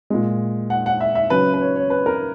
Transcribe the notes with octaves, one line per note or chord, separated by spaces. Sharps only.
A#2 G#3
F#5
F#5
E5
E5
C#3 F#3 B4
B4
C#5
C#5
B4
A#4